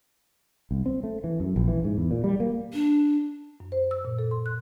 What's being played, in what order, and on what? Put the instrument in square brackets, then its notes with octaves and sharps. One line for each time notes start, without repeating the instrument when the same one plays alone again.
[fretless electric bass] C2
C4
A3
E3
F#2
A#1
E3
G#2
E2
A#2
G3
A#3
[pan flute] D4
[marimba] F#2
C5
E6
A#2
A4
C6
F#6